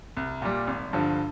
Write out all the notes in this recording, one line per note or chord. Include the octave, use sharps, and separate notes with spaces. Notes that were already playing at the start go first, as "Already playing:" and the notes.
C2
A#2 G3
G#1
G2 D3 F3